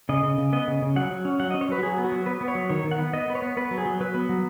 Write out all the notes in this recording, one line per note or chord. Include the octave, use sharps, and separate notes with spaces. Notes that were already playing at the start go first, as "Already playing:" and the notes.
C#3 D#5
C#3
C#3
B3 D#5
C#3
C#3
F#3 F#5
F#3
C#4
F#3 F#5
D#5
C#4
C#5
F#3 B4
F#4
F#3 G#4
B3
F#4
F#3
B3 B4
B3
C#5
F#3
D#3 C#5
D#3
F#5
B3
B3 D#5
B3 B4
C#5
B3
B3 B4
F#3
G#4
F#3
F#3 B4
B3
F#3